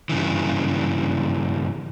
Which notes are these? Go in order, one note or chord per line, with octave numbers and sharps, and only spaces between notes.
G2 C#3 E3